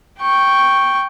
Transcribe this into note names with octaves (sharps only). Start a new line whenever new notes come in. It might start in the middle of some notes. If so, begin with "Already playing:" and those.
G5 C#6